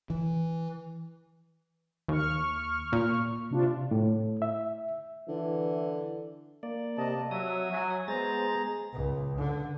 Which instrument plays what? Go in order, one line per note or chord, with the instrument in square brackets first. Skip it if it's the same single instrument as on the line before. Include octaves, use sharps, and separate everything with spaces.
[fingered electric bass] E3
[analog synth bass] D#2 [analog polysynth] C#6 F6
[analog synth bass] A#2
[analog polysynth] C3 D4 F4
[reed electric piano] A2
E5
[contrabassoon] D3 [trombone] E3
[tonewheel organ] A#3 D5
[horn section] C3 D#5 A5
[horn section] F#3 [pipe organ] E5 [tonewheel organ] D#6
[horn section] F#3 [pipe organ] G#5
[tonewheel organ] G#3 A6 [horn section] B3 C5 [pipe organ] G#4 A#5
[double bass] C#2
D3